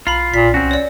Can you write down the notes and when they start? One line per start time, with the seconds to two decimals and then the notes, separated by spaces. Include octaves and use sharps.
0.07 B1 F4 A#5 B5
0.34 A#1 A#2 B6
0.54 C2 C4 C#4 F#4
0.71 C#5 D5